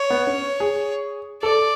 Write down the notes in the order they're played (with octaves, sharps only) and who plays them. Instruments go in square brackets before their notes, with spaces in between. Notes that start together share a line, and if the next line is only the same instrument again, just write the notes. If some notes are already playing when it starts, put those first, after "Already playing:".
Already playing: [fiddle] C#5
[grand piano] B3
C#4
G#4
[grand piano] A4 [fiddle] D5